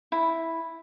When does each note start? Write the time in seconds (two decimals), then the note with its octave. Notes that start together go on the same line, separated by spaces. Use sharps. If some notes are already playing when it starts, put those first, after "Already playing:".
0.12 E4